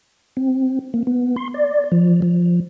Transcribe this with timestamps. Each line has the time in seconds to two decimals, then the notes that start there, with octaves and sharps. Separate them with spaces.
0.37 C4
0.94 A#3
1.07 B3
1.36 C6
1.54 D5
1.92 F3
2.22 F3